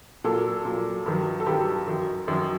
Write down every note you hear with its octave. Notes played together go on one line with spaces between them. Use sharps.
A#2 F#3 A4
A#2 F#3
G2 D#3 F#3
A4
G2 D#3 F#3 G4
F#2 D#3 F#3
F#2 D#3 F#3